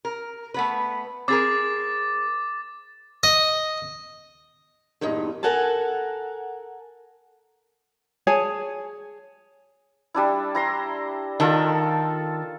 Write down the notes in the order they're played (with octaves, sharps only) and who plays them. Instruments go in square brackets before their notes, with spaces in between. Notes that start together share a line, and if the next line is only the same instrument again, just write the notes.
[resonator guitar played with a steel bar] A#4
A3 B3 B4
[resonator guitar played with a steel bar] C4 G#4 A#4 [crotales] D6 A6
[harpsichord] D#5
[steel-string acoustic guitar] E2 G2 A#2 D#4
A4 A#4 F#5 G#5 A5
[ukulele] G#4 C#5 G#5 A5
[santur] G3 D4 E4
E4 A#5 C6
[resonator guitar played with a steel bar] D#3 [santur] F4 A4 A5